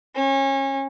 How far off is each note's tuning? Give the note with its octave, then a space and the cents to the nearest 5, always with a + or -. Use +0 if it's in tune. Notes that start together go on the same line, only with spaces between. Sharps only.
C#4 -30